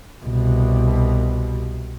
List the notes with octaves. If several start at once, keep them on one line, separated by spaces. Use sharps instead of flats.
C2 B2